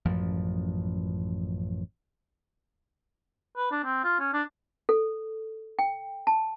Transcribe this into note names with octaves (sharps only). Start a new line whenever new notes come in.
A1 F#2 F3
B4
D4
C4
F4
C#4
D4
A4
G5
A5